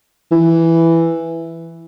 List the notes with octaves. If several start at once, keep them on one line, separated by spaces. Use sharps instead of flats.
E3